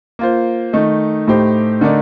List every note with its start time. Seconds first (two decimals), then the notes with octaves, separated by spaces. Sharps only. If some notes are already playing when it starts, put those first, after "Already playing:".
0.19 A#3 F4 C5
0.73 D#3 A3 D#4
1.28 A2 A3 D#4 G4 C5
1.81 D3 A3 D#4 A#4 D5